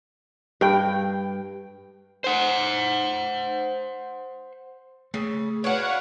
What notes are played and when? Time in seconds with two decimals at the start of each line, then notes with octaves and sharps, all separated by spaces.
0.61 G2 G5
2.24 C5 F#5
5.14 C#3 A3
5.64 D4 F#4 B4 C#5 F5 F#5